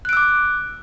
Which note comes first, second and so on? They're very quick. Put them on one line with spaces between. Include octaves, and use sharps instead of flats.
F#6 D7 E6 D6